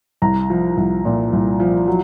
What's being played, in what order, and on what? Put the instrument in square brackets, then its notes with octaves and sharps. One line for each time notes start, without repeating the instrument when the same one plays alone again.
[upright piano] C2 A#5
F3
C2
A#2
C2
F3
F#3